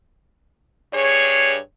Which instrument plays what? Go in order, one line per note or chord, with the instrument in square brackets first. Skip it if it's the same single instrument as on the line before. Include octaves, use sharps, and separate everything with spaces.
[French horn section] G2 G#4 C#5